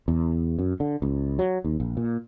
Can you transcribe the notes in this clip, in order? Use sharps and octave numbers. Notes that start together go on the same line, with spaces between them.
E2
F#2
D3
C#2
F#3
D#2
A#1
A#2